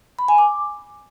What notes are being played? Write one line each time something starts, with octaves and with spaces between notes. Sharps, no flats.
B5
G#5
D6